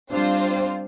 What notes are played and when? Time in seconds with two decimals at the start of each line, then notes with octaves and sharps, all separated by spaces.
0.11 G3 C4 D4 F4 C5